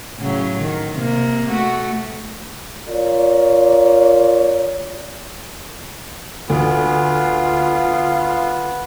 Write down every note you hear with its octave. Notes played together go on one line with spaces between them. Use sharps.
A2 C#3 F#3
D#3
C3 A#3
A3 F#4
F4 A#4 C#5 D5
D2 B3 F4